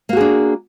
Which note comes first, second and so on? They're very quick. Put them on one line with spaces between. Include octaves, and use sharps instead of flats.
A#3 F#4 G#4 D4